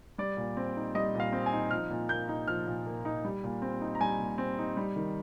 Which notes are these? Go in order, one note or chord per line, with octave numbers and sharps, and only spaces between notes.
G3 D5
A#2
C4
D#4
G3 D#5
A#2
F5
C4
G#5
D#4
F3 F6
A#2
A#3 G6
D#4
F3 F6
A#2
A#3
D#4
G3
A#2
C4
D#4
A#5
G3 G#5
A#2
C4
D#4
G3
D#3